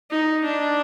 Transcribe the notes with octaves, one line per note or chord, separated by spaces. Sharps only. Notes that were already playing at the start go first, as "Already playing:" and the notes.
D#4
D4